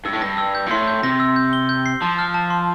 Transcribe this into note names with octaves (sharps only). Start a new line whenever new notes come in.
G2 E6
A2
G2 A#6
E6
G6
A#2
A2 C6
G6
C3 A#6
E6
G6
G7
G6
C7
F3 A5
F6
A5
C6